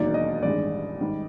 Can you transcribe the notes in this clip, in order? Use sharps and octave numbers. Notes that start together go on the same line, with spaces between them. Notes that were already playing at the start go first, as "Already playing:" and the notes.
Already playing: E1 D#2 D#3 F#3 A#3 D5
D#5
A1 G2 D#3 G#3 D5
G#2 D#3 G3